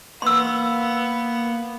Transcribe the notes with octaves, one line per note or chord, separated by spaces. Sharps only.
A#3 B3 C6 E6